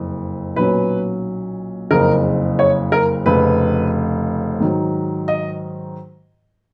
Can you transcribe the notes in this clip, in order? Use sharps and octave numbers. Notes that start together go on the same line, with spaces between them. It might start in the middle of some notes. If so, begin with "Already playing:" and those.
Already playing: F#1 F2
B1 A#2 F#3 C#4 B4
F#1 F2 C#3 A#4
C#5
A#4
F1 F2 C#3 B4
G#2 D#3 F#3
D#5